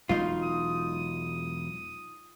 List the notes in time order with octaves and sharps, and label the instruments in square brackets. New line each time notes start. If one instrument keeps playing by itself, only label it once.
[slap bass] E1 F#3 G#3 [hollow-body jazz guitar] D#4 F4
[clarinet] D#6